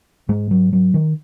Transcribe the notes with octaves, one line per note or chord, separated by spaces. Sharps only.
G#2 G#3
F#3
F#3
D#3